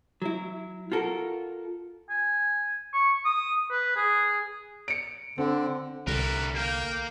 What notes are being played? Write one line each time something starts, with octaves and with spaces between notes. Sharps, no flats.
F#3 E4
F4 F#4 A4 A#4
G#5
C#6
D#6
B4
G#4
C#7 D7
D3 C4
C2 D3 G3 A#4 B4
A#3 F5 G5